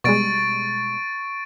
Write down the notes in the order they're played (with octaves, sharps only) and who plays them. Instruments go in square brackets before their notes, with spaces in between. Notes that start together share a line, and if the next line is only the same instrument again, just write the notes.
[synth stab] B2 G3 G#3 [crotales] C#6 A6 D7